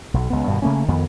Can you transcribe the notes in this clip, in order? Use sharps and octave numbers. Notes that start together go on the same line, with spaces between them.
B1
C#2 B3
G2 B2 D#3
C#3 A3 A#3 C#4
F2 D#3 B3